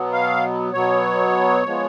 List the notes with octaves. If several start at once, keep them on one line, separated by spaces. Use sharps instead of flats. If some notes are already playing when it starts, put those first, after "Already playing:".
Already playing: B2 F#3 B3
F5
B2 F#3 B3 C#5
F3 G#3 B3